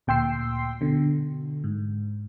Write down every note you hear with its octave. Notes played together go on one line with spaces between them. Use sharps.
D2 A#2 G5 C6 E6 C7
B2 D3
G#2